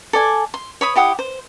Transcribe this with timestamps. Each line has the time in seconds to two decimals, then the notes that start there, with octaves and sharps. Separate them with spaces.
0.13 A4 D5 G#5
0.54 C6
0.81 C#5 B5 D#6
0.95 E4 G4 F#5 D#6
1.19 C5